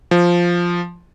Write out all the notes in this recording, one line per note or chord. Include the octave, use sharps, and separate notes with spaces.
F3